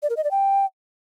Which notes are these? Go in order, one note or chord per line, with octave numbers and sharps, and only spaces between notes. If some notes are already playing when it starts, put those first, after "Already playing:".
D5
A#4
D#5
D5
G5